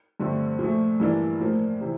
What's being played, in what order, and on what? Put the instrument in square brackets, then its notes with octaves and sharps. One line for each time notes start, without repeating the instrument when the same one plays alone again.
[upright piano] G2 D3 F3 A3 C4
A#2 F3 A3
G2 E3 A#3 D4
A2 F3 A#3
C3 E3